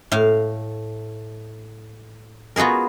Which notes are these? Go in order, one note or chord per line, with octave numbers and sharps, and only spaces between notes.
A2 F5
B3 F4 F#4 G#4 A#4